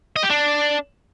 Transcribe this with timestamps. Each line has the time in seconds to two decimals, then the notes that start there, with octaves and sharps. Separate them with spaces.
0.16 D#5
0.23 G4
0.30 D4